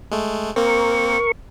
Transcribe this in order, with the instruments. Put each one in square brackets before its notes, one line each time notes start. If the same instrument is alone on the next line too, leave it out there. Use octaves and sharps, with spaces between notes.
[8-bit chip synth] G#3 A3
[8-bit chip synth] A#3 C4 [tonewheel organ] A#4 C#6